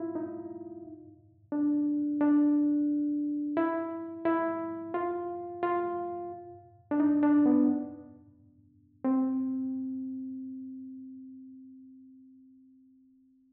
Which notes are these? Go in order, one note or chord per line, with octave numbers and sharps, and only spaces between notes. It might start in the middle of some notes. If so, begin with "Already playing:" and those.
Already playing: E4 F4
D#4
D4
D4
E4
E4
F4
F4
D4
D#4
D4
B3
C4